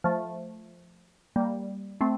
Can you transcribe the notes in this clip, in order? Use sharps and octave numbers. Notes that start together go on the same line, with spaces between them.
F3 A3
G3 A#3
A3 C4